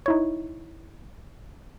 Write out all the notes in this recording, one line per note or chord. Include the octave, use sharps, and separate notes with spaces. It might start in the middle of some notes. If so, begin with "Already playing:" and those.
D#4 E4 C#5